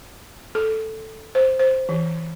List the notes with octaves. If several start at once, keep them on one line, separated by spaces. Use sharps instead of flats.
A4
C5
C5
E3